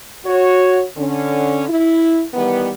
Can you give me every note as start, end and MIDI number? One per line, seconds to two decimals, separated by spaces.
0.26 0.83 66
0.26 0.83 73
0.97 1.64 50
0.97 1.64 61
1.68 2.23 64
2.34 2.70 51
2.34 2.70 52
2.34 2.70 55
2.34 2.70 59